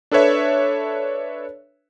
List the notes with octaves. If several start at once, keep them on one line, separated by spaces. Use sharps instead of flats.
D4 A4 B4 C#5 E5